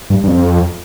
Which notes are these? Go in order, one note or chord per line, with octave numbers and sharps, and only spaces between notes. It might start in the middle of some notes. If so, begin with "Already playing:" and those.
G2
G2
F2